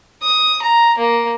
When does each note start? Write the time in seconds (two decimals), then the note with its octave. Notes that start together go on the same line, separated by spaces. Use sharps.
0.22 D#6
0.62 A#5
0.98 A#3